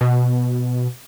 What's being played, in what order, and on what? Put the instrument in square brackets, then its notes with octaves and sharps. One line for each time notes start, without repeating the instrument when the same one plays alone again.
[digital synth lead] B2